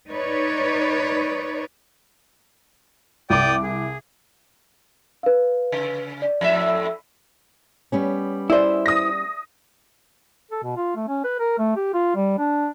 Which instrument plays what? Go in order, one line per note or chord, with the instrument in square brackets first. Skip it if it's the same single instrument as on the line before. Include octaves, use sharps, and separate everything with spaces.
[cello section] D#4 B4 C#5 D5
[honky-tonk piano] C2 D6 [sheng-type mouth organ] D5 G5 D#6
[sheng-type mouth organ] G#4
[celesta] B4 F5
[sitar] C#3
[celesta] D5
[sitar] F2 A2 E5
[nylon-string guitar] G3 B3 C#4
[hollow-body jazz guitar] E4 C5 [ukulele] G#4 D5 E5
[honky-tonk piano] D#6 A#6
[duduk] A4
B2
F4
A3
C#4
B4
A#4
A3
G4
F4
G3
D4